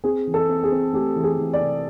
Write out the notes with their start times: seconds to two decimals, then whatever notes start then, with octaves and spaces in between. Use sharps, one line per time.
0.04 C4 G#4
0.27 E3
0.34 A4
0.49 C4
0.64 G#4
0.71 C4
0.93 A3 G4
1.16 E3
1.24 G#4
1.38 E3
1.53 D5
1.60 C3